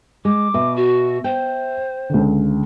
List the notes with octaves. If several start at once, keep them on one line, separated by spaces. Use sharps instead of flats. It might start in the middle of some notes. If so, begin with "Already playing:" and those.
G#3 D6
B2 E5
F#4
C5 G5
C#2 D3